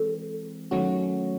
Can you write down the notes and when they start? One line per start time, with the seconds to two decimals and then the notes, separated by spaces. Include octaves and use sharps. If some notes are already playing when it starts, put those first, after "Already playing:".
Already playing: E3 G#3 C4 A4
0.71 D#3 F#3 A3 C#4 F#4